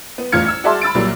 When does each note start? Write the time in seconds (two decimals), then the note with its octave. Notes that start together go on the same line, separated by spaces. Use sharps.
0.18 B3
0.32 A1 E2 F4 F6 G#6 C#7
0.48 E6
0.64 F#4 G#4 D5 E5 A5 C6
0.81 B5 E6 A6 D7
0.95 C2 A#2 F#3 G3